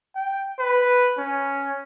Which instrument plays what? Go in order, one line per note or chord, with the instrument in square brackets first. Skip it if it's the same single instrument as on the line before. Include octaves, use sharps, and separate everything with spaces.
[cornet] G5
B4
C#4